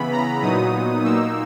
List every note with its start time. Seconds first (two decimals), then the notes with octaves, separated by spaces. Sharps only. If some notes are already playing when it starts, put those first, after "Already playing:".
Already playing: C#3 E3 B3 B5
0.11 A#5
0.42 A#2 F#3 B3 D#4 D#6
1.03 A#2 A#3 D#4 E6